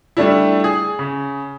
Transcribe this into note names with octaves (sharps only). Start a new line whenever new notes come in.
G3 A3 D4 E4
G#4
C#3